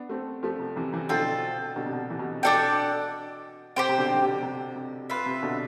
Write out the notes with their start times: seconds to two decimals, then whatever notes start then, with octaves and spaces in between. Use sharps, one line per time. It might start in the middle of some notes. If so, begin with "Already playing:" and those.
Already playing: B3 D4
0.09 A3 C4
0.43 F3 A3
0.59 C3
0.76 C3 E3
0.93 C3 E3
1.09 B2 D3 C4 F4 A4
1.76 B2 D3
1.86 C3
1.93 B2
2.10 C3 E3
2.19 B2
2.27 C3
2.43 B2 D4 A4 D5 G5
3.76 C3 G4 C5 G5
3.89 C3
3.98 B2 D3
4.15 D3
4.21 C3
4.43 C3
4.76 C3
5.10 F4 B4 E5
5.26 C3
5.42 B2 D3